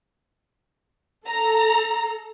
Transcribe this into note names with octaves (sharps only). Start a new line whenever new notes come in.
A4 A#5